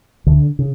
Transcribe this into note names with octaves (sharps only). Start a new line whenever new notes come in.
D2 D3
C#3